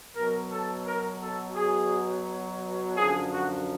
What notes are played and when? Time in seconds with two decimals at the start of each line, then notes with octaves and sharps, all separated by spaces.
0.16 B2 F#3 A#4
0.52 A4
0.86 A#4
1.22 A4
1.56 G#4
2.97 F#2 D3 F3 G#4
3.32 F#4